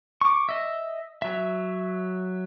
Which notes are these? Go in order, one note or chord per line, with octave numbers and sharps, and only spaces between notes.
C#6 D6
D#5 E5
F#3 E5